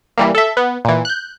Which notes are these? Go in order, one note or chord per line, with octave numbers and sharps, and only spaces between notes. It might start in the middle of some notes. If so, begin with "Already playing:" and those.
E3 G3 A#3
A4 E5
B3
A#2 E3
F#6 G6